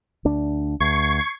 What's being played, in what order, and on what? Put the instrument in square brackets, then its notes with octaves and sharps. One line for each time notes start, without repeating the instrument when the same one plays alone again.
[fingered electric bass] D2 D4
[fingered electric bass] D2 [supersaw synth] C#6 G#6 C7